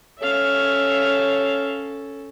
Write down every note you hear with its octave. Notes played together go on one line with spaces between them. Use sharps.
C#4 A4 C#5 E5 F5